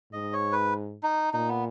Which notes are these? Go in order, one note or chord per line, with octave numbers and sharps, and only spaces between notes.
G#2 D#5
C#5
B4
D#4
A#2 D#4
B3